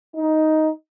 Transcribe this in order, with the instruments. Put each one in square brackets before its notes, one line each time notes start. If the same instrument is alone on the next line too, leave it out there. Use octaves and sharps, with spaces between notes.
[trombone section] D#4